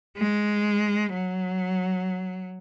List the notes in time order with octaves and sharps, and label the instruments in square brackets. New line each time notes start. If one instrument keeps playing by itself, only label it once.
[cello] G#3
F#3